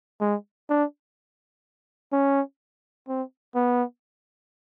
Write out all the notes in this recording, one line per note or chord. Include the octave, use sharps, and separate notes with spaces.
G#3
D4
C#4
C4
B3